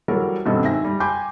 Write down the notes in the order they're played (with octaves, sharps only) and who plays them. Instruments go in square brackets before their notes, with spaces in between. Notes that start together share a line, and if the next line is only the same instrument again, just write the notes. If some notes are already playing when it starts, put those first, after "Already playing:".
[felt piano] E3 F#3 G3 A4 A#4
D#1 G2 B2 C4 A4 D#5
G#2 E5 G#5 A#6
G3
G5 G#5 B5 C6 D6 G6